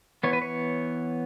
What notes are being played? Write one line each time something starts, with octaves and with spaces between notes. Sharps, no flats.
E3 B3 C#5
B4
C#5